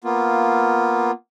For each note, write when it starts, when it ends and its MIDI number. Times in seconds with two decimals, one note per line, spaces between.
0.04 1.11 58
0.04 1.11 59
0.04 1.11 65